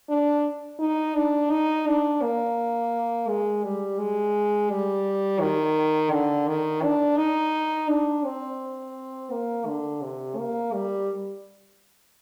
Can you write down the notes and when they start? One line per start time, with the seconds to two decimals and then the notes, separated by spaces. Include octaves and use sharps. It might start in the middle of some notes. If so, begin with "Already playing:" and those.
0.09 D4
0.79 D#4
1.15 D4
1.51 D#4
1.86 D4
2.22 A#3
3.28 G#3
3.63 G3
3.99 G#3
4.70 G3
5.40 D#3
6.11 D3
6.48 D#3
6.83 D4
7.18 D#4
7.89 D4
8.25 C4
9.31 A#3
9.67 D3
10.02 C3
10.37 A#3
10.73 G3